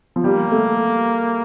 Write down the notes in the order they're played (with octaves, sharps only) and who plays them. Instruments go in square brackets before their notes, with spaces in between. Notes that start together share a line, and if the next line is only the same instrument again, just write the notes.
[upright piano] F3
[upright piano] G3 [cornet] A#3
[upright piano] A3